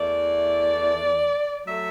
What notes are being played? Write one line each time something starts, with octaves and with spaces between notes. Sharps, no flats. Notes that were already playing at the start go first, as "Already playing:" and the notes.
Already playing: E2 E3 A3 D5
F#3 A3 E5